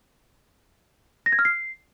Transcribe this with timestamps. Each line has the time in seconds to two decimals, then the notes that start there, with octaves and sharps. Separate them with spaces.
1.26 A#6
1.32 G#6
1.39 F6
1.45 C7